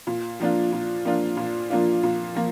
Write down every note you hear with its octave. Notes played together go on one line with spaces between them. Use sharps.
A#2
F3 A#3 D4 F4
A#2
F3 A#3 D4 F4
A#2
F3 A#3 D4 F4
A#2
F3 A#3